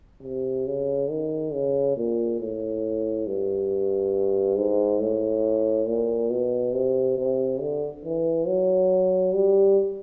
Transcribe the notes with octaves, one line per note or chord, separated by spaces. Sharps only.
C3
C#3
D#3
C#3
A#2
A2
G2
G#2
A2
A#2
B2
C3
C3
D3
E3
F#3
G3